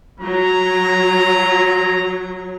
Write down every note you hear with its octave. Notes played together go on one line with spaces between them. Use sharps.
F#3 A#5